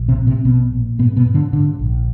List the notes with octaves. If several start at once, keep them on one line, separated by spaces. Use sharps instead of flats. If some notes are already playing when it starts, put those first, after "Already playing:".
Already playing: A#1
C3 C4
A#2
C3 C4
A#1 B2 B3
A#2
G#2 B2 B3
B2 B3
G#2
D3 D4
G#2 D3 D4
A#1